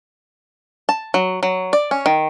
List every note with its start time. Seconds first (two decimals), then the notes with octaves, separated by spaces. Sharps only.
0.89 A5
1.14 F#3
1.43 F#3
1.73 D5
1.91 C#4
2.06 D#3